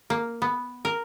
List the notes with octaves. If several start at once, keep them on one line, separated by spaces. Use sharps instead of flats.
A#3
B3
A#4